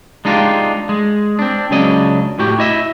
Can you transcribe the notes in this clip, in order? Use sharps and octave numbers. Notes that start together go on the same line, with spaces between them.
G#3 D4 D#4 F4 G4
G#3
C4 D4
C#2 C#3 F#3 D4 D#5
A2 F#4 G4
E4 D#5 E5